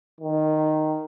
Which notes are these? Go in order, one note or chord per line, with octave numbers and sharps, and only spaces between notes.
D#3